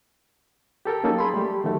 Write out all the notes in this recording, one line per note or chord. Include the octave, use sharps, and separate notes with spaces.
G4 A4 A#4 G5
F#3 A#3 C#4 D#4 A4
G#4 B5 C6
G3 A3 G4
D#3 F#3 A3